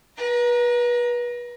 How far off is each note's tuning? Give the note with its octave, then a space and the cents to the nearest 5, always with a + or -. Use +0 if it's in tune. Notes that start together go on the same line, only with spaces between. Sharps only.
B4 -30 A#5 +15